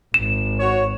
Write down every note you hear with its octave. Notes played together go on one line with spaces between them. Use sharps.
G#1 E7
F#4 C#5